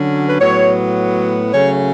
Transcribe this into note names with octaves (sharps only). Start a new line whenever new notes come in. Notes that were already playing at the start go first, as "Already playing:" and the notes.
Already playing: D3 F#3 C#4
B4
A2 F#3 B3 C#5
C#3 F#3 A3 C#4 C#5